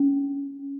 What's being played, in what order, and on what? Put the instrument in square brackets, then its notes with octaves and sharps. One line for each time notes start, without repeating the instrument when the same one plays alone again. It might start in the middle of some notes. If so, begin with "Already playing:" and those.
Already playing: [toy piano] C#4